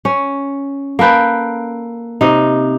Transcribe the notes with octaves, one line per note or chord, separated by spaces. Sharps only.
C#4
A#3 A4 B4 G5
C3 D#4